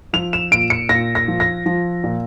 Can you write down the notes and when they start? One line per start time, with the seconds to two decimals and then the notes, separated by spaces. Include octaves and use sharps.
0.13 F3 F7
0.33 E7
0.51 A#2 D7
0.70 C#7
0.89 A#2 A#6
1.15 A#6
1.28 F3
1.40 A#6
1.66 F3
2.04 A#2